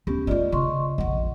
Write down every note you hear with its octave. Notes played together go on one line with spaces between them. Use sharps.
D2 B3 C#4 G4
G3 A3 F4 D5 D#5
C#3 D#5 C6 C#6
A#1 F2 D#5 F#5